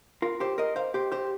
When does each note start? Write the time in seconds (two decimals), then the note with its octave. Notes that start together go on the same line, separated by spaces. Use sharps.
0.22 F4 A#4
0.40 G4 C5
0.58 A#4 D#5
0.76 C5 F5
0.94 G4 C5
1.12 G4 C5